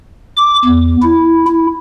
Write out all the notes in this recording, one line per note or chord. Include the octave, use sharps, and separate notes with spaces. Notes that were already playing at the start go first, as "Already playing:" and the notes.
D6
E2
E4
E4